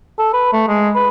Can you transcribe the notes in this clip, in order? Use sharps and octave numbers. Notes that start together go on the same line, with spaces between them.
A4
B4
A3
G#3
B4